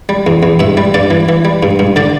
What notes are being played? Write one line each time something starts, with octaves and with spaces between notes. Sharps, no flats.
G3
E2
E2
G2 E5
G3
G2 D5
E3
E3
G3
G2
G2
D3 D5